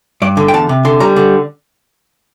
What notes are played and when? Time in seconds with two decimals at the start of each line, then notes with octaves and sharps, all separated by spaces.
0.22 G2 D5
0.37 D3
0.48 G5
0.54 E2 A5
0.69 C3
0.85 D3 C6
1.00 G3 A#5
1.16 D3